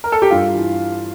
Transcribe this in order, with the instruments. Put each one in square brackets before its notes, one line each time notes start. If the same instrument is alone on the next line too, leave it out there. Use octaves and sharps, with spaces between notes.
[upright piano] A#4
A4
G4
G2 F4
E3